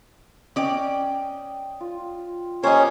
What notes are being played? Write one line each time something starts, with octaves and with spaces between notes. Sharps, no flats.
C#4 D5 D#5 G5
F4
A#3 C#4 G4 C5 C#5 D#5